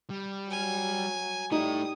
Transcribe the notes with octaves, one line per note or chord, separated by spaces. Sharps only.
G3
F#3 G#5
G3 A3 D#4 E4 D#6